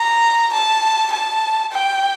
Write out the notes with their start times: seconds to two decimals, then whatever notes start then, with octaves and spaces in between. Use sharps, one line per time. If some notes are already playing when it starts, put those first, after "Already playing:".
Already playing: A#5
0.53 A5
1.12 A5
1.72 G5